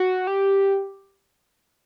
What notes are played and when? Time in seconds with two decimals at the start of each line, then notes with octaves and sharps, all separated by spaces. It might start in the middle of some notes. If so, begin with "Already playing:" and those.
Already playing: F#4
0.27 G4